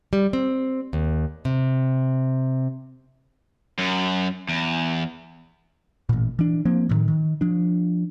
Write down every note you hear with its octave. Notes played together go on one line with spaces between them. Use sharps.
G3
C4
D#2
C3
F#2
E2
A1 A#2
E3 D4
F3 A#3 C4
A1 A2 D#3
D#3
F3 D4